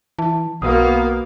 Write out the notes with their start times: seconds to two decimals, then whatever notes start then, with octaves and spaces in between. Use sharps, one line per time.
0.19 E3 A5
0.62 B1 A#3 B3 F#4 B4 F5 D#6